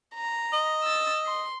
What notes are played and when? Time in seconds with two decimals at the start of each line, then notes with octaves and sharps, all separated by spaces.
0.15 A#5
0.53 D#5
0.84 E6 A6
1.26 C6